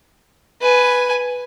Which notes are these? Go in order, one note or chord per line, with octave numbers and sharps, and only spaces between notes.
B4 G#5